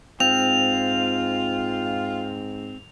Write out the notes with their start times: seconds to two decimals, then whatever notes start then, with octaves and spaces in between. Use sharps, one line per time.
0.20 G#2 C4 F4 F7